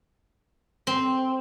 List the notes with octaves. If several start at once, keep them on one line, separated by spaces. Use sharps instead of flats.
C4